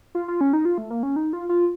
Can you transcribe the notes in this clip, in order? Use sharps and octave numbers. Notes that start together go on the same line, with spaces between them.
F4
F4
C#4
D#4
F4
A3
A#3
C#4
D#4
F4
F4